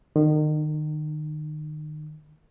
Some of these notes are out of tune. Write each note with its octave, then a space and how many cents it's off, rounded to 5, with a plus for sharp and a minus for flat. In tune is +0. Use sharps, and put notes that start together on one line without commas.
D#3 -35